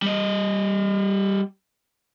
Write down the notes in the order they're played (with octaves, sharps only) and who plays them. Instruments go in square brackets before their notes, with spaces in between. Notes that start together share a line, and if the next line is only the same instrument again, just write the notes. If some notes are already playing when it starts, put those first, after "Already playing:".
[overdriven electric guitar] G3 D#5